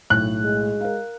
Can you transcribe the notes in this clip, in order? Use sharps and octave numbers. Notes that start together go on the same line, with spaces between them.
B1 A2 F#6
G#3
A#4 F5